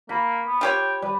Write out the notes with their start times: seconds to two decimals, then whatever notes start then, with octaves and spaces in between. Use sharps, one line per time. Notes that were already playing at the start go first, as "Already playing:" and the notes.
0.09 A#3 B5
0.47 B3
0.61 F4 G4 C#5 G5
1.02 G3 B4